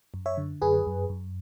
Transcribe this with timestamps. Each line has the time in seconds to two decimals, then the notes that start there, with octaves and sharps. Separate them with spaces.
0.14 F#2
0.26 C#5 E5
0.37 D3
0.62 F#2 G#4 B4
0.87 F#2
1.10 F#2